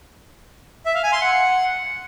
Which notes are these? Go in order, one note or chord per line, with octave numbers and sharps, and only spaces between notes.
E5
F5
G#5
C6
F#5